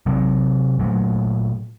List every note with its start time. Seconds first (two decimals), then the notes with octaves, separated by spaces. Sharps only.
0.06 C3 F#3 C4
0.79 A#2 F#3 A3